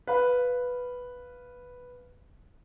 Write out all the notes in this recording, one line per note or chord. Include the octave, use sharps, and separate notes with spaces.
B4 F5 B5